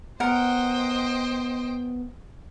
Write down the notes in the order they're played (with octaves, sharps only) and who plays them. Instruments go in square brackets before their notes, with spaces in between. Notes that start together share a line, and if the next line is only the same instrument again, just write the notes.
[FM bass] B3 [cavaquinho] A#4 F#5 [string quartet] C5 D#5 G5